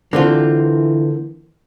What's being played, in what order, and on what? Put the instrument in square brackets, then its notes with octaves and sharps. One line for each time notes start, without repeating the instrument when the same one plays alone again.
[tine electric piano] D3 [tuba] E3 [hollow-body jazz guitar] A#3 C4 F4